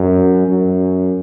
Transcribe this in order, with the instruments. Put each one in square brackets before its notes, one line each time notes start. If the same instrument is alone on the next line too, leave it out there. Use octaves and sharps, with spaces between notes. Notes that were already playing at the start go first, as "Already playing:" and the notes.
Already playing: [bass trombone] F#2
F#2